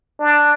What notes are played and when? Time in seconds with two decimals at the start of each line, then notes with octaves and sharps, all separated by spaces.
0.20 D4